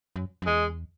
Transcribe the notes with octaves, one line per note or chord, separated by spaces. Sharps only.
F#2
F#2
E2 G#3